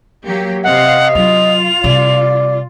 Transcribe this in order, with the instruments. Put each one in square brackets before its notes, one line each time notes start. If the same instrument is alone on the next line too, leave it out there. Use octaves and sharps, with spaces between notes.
[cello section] F#3 A#3 G4
[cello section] C3 F5 [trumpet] D#5 [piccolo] F#5
[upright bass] F#3 D4 [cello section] F4 [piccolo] F7
[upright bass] C3 G3 [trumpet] D5